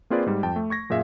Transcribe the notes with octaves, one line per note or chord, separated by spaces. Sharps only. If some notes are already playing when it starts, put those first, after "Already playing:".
A#3 C4 F4 G#4 B4 D5
G#2 G3
F2 G5 A5
A3
C#6 G#6 A#6
F#2 A#2 G#4 E5 F5